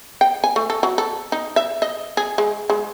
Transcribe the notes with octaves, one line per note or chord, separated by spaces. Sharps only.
G5
G#5
A3
A4
F#3
A4
D#4
E5
D#5
G#4
G#3
G#3